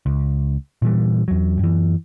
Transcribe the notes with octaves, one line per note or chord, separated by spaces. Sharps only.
C#2
A#2 E3 G3
E2 F#3
F#2 E3